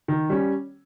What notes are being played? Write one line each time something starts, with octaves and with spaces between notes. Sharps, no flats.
D#3
G3 C#4